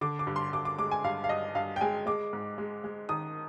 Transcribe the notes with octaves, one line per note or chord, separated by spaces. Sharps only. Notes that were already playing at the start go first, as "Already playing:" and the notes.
D3 D6
D6
G2
C6
G2 D6
D6
G#3 D6
G#5
G2 F5
F5
G2 D#5
G2 F5
G5
G#3 G#5
G#3 D6
G#2
G#3
G#3
D#3 D#6